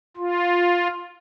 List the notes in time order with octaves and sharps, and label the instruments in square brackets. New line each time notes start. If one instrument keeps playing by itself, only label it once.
[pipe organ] F4